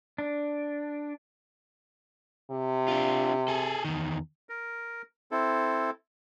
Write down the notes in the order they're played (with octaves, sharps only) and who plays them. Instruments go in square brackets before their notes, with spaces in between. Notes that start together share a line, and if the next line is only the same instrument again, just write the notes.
[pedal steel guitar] D4
[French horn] C3
[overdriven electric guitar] D4 F4
G#4 A4
E2 D#3
[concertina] A#4
C4 E4 A4